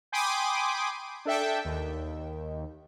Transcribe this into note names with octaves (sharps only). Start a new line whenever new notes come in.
G5 G#5 B5 C6 D6 D#6
D4 A4 E5 G5
D#2